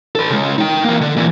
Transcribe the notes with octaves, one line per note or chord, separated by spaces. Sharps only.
A4 B4
C#3 G#3
D#4 G5
E3 A#3
D3
A#2 E3